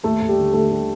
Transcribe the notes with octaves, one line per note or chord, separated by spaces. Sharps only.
D#2 A3 A4
D#2
G3 G4
D3
D3 A3 A4
D3 G3 G4